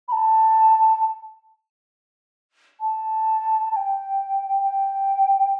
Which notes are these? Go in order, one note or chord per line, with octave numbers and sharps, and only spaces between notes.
B5
A5
A5
A5
G5
G5